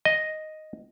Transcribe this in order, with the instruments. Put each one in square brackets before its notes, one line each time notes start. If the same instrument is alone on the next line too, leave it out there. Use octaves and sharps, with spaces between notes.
[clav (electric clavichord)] D#5